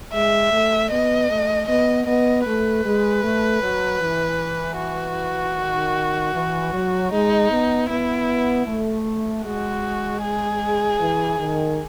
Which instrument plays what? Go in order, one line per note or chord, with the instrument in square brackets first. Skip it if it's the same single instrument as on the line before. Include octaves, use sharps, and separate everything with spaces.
[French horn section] G#3 [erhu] E5
[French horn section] A3
[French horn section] B3 [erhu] D#5
[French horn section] A3
[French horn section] B3 [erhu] D#5
[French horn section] B3 [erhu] D#5
[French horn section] A3 [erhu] B4
[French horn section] G#3
A3
F#3
E3
[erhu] F#4
[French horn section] D#3
E3
F#3
[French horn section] G#3 [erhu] D#4
[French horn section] B3
[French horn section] B3 [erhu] E4
[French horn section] A3
[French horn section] G#3 [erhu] F#4
[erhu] G#4
[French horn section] E3
D#3